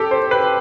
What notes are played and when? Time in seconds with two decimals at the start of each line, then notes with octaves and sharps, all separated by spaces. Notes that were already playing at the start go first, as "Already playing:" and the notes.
Already playing: G4 A4
0.11 C5
0.31 B4